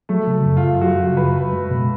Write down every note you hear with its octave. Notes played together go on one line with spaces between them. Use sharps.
F#3 A3
C#3
F#2
F4
F#2
F4
F#3 F#4
C#3
F#2 B4
F#2
G#3
B2